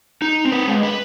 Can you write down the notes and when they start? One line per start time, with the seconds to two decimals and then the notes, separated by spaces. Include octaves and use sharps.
0.22 D#4
0.45 C4
0.52 B4
0.68 G#3
0.83 B4